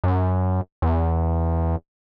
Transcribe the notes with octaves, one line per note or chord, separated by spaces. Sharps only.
F#2
E2